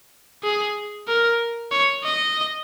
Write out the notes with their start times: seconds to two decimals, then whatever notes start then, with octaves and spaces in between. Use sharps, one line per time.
0.44 G#4
1.08 A#4
1.72 C#5
2.05 D#5